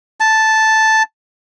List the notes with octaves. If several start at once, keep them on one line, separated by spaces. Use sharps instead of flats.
A5